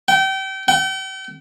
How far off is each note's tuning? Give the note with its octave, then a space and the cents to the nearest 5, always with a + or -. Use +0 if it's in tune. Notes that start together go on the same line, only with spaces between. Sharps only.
G5 -30
G5 -40